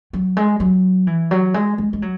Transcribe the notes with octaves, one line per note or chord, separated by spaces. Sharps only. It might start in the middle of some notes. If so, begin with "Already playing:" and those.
F#3
G#3
F#3
E3
F#3
G#3
G#3
G#3
F#3